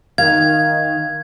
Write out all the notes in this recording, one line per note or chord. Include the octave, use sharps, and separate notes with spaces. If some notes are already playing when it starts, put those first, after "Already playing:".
D#3 F5 G#6